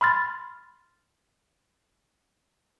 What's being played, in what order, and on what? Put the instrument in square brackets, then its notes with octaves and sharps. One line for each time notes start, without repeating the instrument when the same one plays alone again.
[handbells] B5 C6 F6 A6